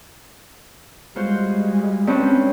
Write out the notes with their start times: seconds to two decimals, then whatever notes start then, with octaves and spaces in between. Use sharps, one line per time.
1.16 G3 G#3 F4 F#4 C5
2.07 G2 C4 C#4